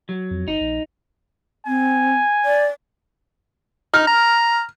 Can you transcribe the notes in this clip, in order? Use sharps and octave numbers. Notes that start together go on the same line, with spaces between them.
F#3
F2
G1 D#4
A#1
C4 G#5
D5
D#4 F6
A#5